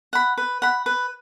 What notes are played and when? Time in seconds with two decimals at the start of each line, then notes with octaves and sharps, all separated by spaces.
0.13 F#5 B5
0.38 B4
0.62 F#5 B5
0.86 B4